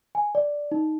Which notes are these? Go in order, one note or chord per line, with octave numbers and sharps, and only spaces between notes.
G#5
D5
D#4